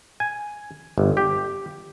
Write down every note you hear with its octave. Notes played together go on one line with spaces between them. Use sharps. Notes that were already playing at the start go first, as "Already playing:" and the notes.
G#5
G1
G4